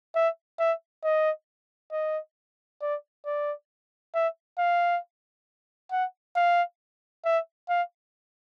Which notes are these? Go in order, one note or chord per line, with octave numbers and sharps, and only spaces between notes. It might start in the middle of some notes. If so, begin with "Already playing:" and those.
E5
E5
D#5
D#5
D5
D5
E5
F5
F#5
F5
E5
F5